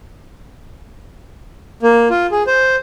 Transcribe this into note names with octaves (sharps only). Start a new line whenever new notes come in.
A#3
F4
G#4
C5